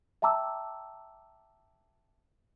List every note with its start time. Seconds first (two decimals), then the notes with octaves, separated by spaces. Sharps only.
0.22 E5 G5 A5 A#5 D6 E6